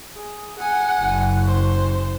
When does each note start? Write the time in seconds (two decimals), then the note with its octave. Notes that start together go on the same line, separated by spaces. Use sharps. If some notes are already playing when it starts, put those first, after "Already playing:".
0.17 G#4
0.59 F#5 G#5
1.01 F#1
1.47 C5